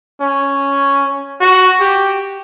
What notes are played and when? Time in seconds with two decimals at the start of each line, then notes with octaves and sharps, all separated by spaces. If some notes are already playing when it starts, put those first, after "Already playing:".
0.21 C#4
1.41 F#4
1.80 G4